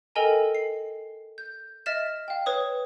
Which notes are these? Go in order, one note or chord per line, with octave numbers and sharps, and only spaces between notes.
A4 A#4 D#5 G5 G#5 A#5
C7
G6
D#5 E5 F6 A6 B6 E7
F5 G5
B4 C#5 D#6